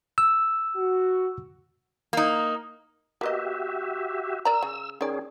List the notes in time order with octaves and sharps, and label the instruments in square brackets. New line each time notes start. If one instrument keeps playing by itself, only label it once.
[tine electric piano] E6
[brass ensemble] F#4
[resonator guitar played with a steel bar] A#3 D#4
[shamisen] A#3 B3 D#5 [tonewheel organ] F#4 G4 E5
[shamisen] A#4 D5 A#5 [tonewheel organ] E6
[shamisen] C#3
[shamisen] D#3 D5 [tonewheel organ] C#4 G#4